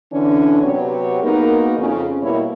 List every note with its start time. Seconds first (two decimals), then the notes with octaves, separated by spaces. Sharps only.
0.12 D3 E3 C#4 D4
0.62 C3 F#3 B3 G4 C#5
1.23 A#3 B3 D#4 F#4 G#4 A#4
1.79 F2 C#3
2.22 B2 G3 A#3 E4 G4 C#5